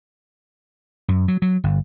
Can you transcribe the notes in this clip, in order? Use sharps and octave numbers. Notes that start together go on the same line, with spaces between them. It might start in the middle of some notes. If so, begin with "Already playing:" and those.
F#2
F#3
F#3
G1